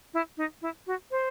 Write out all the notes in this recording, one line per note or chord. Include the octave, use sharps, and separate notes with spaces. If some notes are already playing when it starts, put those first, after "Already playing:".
E4
D#4
E4
F#4
C5